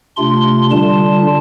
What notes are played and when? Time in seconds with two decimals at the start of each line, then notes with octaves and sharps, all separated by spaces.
0.16 C3 A3 D4 F4 C6
0.71 D3 G3 D4 F4 A5